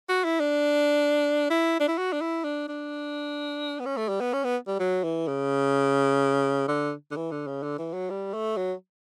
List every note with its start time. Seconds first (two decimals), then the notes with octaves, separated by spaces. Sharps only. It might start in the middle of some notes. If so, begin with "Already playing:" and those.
0.09 F#4
0.24 E4
0.40 D4
1.50 E4
1.80 D4
1.88 E4
1.98 F#4
2.13 D4
2.21 E4
2.44 D4
2.68 D4
3.80 B3
3.86 C#4
3.97 A3
4.09 G3
4.20 B3
4.33 C#4
4.44 B3
4.68 G3
4.79 F#3
5.04 E3
5.27 C#3
6.68 D3
7.11 D3
7.16 E3
7.31 D3
7.47 C#3
7.63 D3
7.78 E3
7.93 F#3
8.10 G3
8.34 A3
8.57 F#3